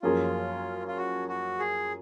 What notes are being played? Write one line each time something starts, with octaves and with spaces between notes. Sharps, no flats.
F#2 F3 A#3 C#4 F4 G#4
F4
F#4
F#4
G#4